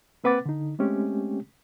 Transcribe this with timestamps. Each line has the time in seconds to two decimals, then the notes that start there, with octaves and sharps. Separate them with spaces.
0.24 A#3 C4 B4 F#5 D6 A6
0.46 D3 D#4
0.79 G#3 A3 C4 C#4 G4